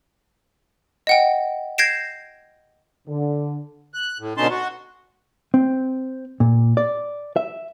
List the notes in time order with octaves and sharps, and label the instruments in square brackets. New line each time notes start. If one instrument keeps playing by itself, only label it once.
[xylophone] D#5 F#5 G5
G6 G#6 A#6 C7 D7 E7
[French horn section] D3
[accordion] F#6
A2
B2 D3 C#4 D#4 A5 C6
F#4
[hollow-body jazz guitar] C4
A#2
D5
E5